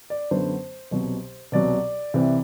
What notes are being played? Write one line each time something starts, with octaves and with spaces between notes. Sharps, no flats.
D5
F#2 D3 F#3 B3 C5
C2 B2 F#3
C2 B2 F#3 D5
C2 C3 E3